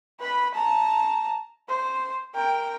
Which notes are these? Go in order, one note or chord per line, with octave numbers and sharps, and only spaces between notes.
B4 B5
A5 A#5
C5
A#4 G5